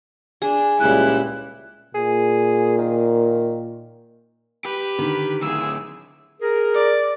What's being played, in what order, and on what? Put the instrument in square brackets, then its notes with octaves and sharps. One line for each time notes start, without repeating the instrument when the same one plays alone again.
[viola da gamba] D4 [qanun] G#4
[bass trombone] C#2 [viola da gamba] A#2 G3 E4 [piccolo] F#6
[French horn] A#2 [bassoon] G#4
[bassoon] D#3
[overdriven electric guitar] G4 [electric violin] B4
[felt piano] D3 [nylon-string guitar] D#3
[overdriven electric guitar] D2 A2 [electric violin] G#4 E6
[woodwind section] G#4 A#4
[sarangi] D5